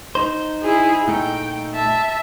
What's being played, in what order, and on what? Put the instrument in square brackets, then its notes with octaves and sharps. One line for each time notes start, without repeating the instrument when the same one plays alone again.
[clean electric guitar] D#4 C5
[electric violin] E4 G#4
[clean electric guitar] A#2 A3 D#4 [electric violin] G5
[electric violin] E5 A5